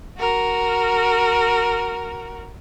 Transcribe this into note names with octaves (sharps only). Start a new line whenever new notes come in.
F#4 A#4